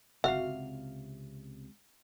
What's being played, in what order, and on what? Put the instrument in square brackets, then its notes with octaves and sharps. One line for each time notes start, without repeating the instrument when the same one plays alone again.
[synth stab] G1 F#4 F6 [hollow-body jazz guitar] C#2 C3 F5 [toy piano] E5